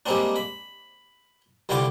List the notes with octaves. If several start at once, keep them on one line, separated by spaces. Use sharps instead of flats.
G3 G#3 A#3 C4 D4
B5
C2 D3 E4 F4 G5 D6